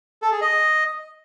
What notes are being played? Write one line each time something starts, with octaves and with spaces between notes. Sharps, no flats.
A4
G#4
D#5